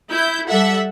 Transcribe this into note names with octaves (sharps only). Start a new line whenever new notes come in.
E4 G6
G3 A4 E5 F#5